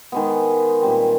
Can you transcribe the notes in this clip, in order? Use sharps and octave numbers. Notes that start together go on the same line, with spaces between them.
D#3 G#3 B3
A#2 G3 C4